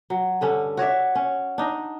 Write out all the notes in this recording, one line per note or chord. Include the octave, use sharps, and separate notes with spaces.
F#3
G2 D3 C#4
F#4 C#5 D5 E5
C#4
D4 D#4